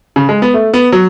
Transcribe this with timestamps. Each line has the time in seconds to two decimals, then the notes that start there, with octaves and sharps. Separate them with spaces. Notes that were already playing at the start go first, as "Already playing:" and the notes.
0.16 C#3
0.29 G#3
0.42 B3
0.54 A3
0.74 B3
0.92 F#3